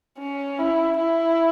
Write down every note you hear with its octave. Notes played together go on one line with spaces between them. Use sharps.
C#4
E4
E4